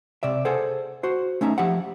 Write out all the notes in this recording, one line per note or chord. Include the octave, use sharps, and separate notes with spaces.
C3 D5 E5
G#4 A4 C5 F#5
F#4 C5
A3 C#4 D#4 E5
F3 G4 E5 F#5